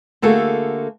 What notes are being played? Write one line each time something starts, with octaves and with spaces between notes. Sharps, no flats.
D3 A3 A#3 F#4 G#4 A4